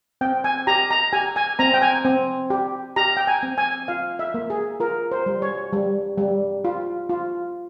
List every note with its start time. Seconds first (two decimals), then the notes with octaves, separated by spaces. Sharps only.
0.21 C4 G5
0.44 G#5
0.67 G4 A#5
0.91 A#5
1.13 G4 G#5
1.36 G#5
1.59 C4 A#5
1.74 G5
1.82 G#5
2.05 C4
2.50 G4
2.96 G4 A#5
3.17 G5
3.27 G#5
3.43 C4
3.58 G#5
3.88 F4 F5
4.19 E5
4.34 A#3
4.50 G#4
4.80 F4 A#4
5.12 C5
5.26 G3
5.42 C#5
5.73 G3
6.18 G3
6.65 F4
7.09 F4